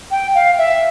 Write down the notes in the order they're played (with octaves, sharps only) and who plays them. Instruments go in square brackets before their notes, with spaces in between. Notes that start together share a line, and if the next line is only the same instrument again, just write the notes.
[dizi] G5
F5
E5